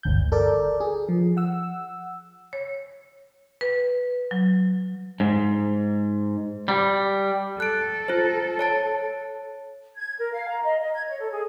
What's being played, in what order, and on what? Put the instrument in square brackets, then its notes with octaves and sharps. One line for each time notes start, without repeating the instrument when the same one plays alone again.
[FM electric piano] G1 D2 G6
A4 A#4 D5
G#4
F3
F#5 E6
[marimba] C#5
B4
F#3
[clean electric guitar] G#2
G3
[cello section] A4 [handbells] F#6 D7
[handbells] F4 C5
C#5 A5 A6
[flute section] G#6
A#4
F5
A#5
D#5
D#5
G#6
C#5
A4
G#4